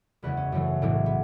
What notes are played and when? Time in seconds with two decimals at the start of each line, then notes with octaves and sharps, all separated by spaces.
0.22 F#1 E2 C#3 G#3 B4
0.37 C#4
0.52 F#2 C#3 E3 A3
0.82 B1 A2 E3 G#3
1.06 B3